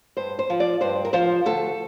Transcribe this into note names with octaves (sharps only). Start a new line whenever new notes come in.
G2 C5
C5
F3
D5
G2 C5
A#4
F3 C5
D2 A4